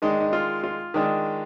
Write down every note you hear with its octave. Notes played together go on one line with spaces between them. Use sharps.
D#3 G#3 D4 D#4
D#4
F4
F4
D#3 G#3 D4